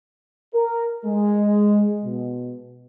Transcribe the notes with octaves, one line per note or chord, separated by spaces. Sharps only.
A#4
G#3
B2